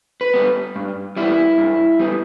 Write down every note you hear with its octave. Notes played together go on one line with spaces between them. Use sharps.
B4
G3 B3
G2
G3 B3 E4
G2
G3 B3